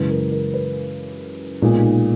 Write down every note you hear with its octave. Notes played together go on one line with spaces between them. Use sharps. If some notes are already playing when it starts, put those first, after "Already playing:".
Already playing: F#2 C#3 E3 G#3 B4
A#4
A#4
B4
B1 A#2 G#3 D#4